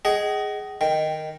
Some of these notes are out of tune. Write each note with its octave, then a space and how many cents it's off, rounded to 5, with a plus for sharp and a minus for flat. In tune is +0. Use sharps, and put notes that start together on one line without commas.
G#4 +0 D#5 +0 F#5 +45
D#3 -5 G5 +0